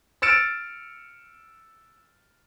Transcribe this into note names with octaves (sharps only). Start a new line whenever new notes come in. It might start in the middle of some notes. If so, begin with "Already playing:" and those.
E6 F6 A6 C#7 D7 E7